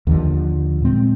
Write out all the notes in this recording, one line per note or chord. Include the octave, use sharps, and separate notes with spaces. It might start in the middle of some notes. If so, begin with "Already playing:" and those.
D#2 D3 F3
A#2 G#3 C4